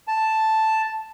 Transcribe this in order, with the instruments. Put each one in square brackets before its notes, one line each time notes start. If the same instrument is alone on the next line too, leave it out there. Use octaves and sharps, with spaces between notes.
[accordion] A5